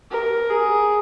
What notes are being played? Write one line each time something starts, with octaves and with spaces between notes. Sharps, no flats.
A#4
G#4